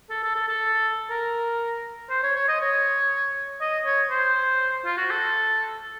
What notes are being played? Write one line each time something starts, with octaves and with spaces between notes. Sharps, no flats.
A4
A4
A4
A4
A#4
C5
C#5
C#5
D#5
C#5
D#5
C#5
C5
F4
F#4
A4